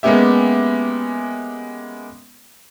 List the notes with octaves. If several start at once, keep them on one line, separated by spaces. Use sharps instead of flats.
G#3 A#3 B3 C#4 G4 E5